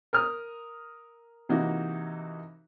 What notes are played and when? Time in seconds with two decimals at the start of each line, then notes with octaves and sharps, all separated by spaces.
0.13 A#4 D#6 F6
1.49 C3 E3 A#3 D#4 F#4